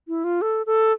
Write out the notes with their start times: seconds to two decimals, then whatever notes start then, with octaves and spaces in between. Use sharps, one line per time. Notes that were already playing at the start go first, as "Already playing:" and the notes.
0.08 E4
0.24 F4
0.42 A4
0.66 A4